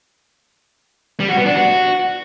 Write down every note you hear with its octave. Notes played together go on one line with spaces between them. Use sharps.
G3
F#4
B3
D4
F#4